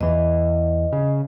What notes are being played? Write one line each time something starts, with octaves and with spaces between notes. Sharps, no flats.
E2 E3 D#5
C#3